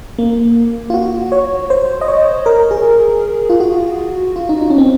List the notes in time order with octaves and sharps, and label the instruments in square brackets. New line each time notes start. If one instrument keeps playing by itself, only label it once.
[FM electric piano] A#3
F4
F#4
C#5
C5
D#5
C#5
A#4
G#4
F4
F#4
F4
D#4
D#4
C#4
C4